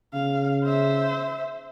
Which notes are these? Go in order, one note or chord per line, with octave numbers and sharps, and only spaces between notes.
C#3 F5
C5 E5